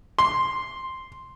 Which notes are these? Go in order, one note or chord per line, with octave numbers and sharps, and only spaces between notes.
C6